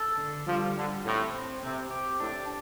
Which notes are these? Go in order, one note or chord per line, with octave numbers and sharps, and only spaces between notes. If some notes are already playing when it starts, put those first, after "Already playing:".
Already playing: A4
D3
F3 G3
D3 G3
A2 C4
C4
C3 C4
G4
A2 D4